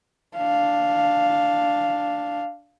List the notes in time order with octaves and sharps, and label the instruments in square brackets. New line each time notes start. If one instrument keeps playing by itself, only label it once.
[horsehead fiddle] D4 F5